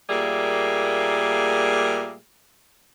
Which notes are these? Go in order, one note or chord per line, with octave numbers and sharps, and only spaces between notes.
A#2 G3 A3 A#3 G#4